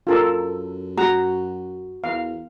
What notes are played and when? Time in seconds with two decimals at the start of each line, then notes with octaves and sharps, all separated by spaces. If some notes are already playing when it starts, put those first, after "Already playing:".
0.07 F#2 F4 A4 A#4
0.98 F#4 A#5
2.04 E2 F5